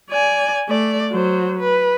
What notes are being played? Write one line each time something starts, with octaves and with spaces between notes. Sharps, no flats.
D5 G#5
A3 D5
F#3 C5
B4